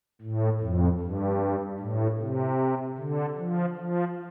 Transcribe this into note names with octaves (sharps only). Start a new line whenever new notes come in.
A2
F2
G2
A2
C3
D3
F3
F3